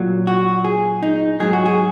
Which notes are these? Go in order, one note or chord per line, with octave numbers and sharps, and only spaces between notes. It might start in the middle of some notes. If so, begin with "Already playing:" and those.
Already playing: A#2 F#3
F#4
G#4
D#4
G#2 F#3 G#4
F#4
G#4